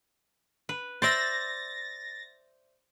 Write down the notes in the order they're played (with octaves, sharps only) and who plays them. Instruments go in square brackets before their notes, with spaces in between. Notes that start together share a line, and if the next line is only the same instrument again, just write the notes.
[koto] B4
[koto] C5 D5 E5 [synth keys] A6 A#6